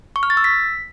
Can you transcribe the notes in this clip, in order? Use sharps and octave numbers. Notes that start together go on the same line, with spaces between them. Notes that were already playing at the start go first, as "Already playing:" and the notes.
C#6
F6
A6
E6
B6